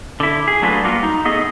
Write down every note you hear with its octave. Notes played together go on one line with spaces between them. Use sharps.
D3 E4
G#4
F#3 A3 D4 F4 F#4 B4
G3 A#3 F4 F#4 A#4
D#4
A3 B3 G#4 D#5